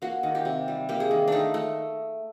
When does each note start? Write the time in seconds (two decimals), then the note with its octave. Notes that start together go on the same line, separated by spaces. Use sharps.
0.02 A#3 F#4
0.23 D#3
0.35 G4
0.45 C3
0.68 G3
0.89 A#3 G4
1.00 G#4
1.11 D#3
1.28 A3 D4 D#4
1.54 A3